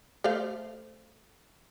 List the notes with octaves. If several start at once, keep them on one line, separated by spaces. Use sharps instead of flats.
A3 C5 F5